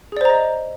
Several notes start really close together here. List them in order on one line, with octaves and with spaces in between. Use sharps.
G#4 D5 C5 A#5 D#5